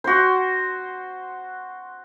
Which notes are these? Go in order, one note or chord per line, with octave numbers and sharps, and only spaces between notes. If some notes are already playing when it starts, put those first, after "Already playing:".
F#4 C5